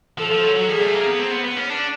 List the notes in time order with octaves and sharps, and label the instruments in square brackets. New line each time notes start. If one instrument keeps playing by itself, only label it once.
[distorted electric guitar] F3 [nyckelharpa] A4
[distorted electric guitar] F3
F#3
F#3
[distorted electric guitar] G3 [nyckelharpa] G#4
[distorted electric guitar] A3
A#3
B3
C4
B3
B3
C#4
D4